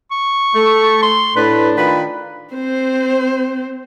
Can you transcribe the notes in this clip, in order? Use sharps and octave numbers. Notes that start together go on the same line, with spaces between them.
C#6
A3
C6
A2 D4 B4
D#3 F4 B4
C4 C5